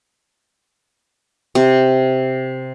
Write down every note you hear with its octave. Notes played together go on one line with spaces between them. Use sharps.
C3